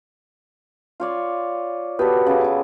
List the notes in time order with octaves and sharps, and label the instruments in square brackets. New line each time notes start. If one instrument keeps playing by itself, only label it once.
[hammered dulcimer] F4 C#5 D5
[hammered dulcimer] B3 A4 [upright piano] F#4 G4 B4
[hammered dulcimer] C#3